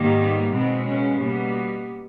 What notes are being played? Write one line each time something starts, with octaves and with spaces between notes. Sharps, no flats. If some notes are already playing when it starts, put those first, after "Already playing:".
Already playing: G#2 D#3 G3 A#3
B3
B2 G#3 B3 C4
C#3 C#4
B2 G3 A#3 B3